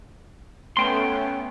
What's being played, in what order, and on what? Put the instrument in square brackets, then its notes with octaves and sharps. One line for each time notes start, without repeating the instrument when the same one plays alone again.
[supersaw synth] A3 B3 C#4 [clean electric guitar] G5 C6